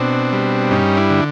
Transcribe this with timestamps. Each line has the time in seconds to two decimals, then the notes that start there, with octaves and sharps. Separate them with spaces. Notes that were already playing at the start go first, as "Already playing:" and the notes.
Already playing: B2 C4 D4
0.32 G3
0.71 G2 C#4 D#4
0.97 D4 E4
1.10 D3